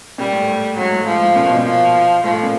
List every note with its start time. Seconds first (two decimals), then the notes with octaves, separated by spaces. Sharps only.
0.18 A#2 G3
0.33 A2
0.47 A2
0.77 G#2 F#3
0.92 A2
1.06 G#2 F3
1.21 A2
1.36 A#2
1.46 B2
1.56 A#2
1.65 F3
2.23 A2 F3
2.33 A2
2.43 A#2